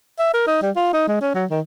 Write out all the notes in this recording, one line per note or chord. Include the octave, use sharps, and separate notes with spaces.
E5
A#4
D#4
G3
F4
D#4
G#3
C#4
F#3
D#3